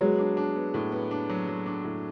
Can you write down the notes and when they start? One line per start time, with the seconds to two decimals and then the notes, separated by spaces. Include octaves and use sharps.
0.01 F#3 G#3 B3
0.19 D4
0.37 D4
0.56 B3
0.74 A2
0.92 B3
1.11 D4
1.29 F#3
1.48 F#3
1.66 D4
1.84 A2